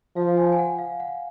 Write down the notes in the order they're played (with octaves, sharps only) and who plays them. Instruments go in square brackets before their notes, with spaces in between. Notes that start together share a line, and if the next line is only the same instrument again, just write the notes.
[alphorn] F3 [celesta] F5
[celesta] G#5
G#5
F#5
F5
F#5